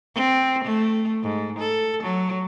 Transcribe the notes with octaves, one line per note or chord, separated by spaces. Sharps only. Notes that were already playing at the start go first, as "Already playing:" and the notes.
C4
A3
G#2
A4
F#3